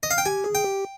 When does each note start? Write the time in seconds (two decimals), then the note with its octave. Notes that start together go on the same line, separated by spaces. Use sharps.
0.03 D#5
0.11 F5
0.18 G5
0.25 G4 G#5
0.44 G#4
0.55 G5
0.64 G4